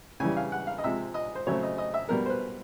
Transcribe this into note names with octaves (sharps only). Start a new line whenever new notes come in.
C#3 E3 G3 G#5
F5
F#5
F5
D#5
C3 F3 G#3 E5
D#5
C5
C#3 F#3 A3 C4 C#5
D#5
D#5
E5
B2 G3 B3 A#4
C5
B4